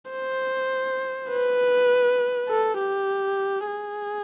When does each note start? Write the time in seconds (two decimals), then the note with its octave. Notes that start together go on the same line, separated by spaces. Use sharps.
0.11 C5
1.30 B4
2.49 A4
2.79 G4
3.67 G#4